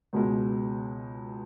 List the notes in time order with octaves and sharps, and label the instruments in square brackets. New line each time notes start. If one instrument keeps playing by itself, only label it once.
[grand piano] C#2 B2 G#3